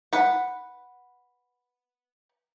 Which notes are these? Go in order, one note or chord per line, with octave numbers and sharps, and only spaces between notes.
B4 F#5